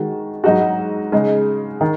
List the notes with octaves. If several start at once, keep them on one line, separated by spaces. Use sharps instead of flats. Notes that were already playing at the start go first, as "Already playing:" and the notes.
Already playing: D#3 G#3 F#4
G#2 F#3 D#4 F#4
C#3 G#3 D#4
D#3